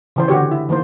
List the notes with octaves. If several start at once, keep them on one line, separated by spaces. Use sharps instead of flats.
C#3 E3 C5
D3 F#4 G4 C#5
E4
D#3 E3 A#3 C5